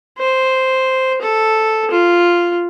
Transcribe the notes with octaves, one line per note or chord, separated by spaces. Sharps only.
C5
A4
F4